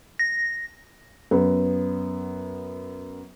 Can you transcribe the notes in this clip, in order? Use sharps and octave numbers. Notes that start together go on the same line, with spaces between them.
A#6
F#2 B3